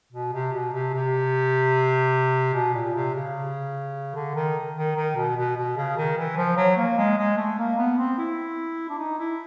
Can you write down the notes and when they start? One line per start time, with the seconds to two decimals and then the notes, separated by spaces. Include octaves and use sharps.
0.12 B2
0.33 C3
0.53 B2
0.72 C3
0.93 C3
2.54 B2
2.74 A#2
2.94 C3
3.15 C#3
4.15 D3
4.35 D#3
4.76 D#3
4.96 D#3
5.16 B2
5.36 B2
5.56 B2
5.76 C#3
5.97 D#3
6.17 E3
6.36 F3
6.57 F#3
6.76 A#3
6.97 G#3
7.17 G#3
7.37 A3
7.58 A#3
7.78 B3
7.98 C4
8.18 E4
8.89 D4
8.98 D#4
9.19 E4